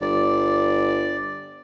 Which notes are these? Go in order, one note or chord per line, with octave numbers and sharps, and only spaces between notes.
G1 D5